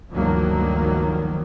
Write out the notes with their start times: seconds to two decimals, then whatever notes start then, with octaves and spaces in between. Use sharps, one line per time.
0.12 D2 G2 D#3 F3 F#3 A#3